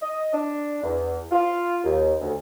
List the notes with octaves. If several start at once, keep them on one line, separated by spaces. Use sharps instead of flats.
D#5
D4
E2
F4
D#2
D2